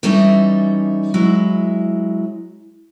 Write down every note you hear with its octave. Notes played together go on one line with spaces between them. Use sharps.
E3 G3 C#4 D#4 A4 E5
F#3 G#3 E4